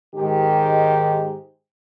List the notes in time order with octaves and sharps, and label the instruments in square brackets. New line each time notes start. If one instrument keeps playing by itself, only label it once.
[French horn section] G#2 D#3 G#3 G4